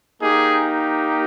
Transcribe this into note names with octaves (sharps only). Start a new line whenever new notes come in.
A#3 D#4 G4 G#4